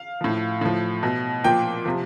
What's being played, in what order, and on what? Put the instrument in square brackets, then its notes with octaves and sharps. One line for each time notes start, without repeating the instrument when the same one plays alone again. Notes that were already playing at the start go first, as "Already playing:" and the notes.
Already playing: [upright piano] F5
A2 F3
A2 F3
B2
A#2 F3 G5
C3 F3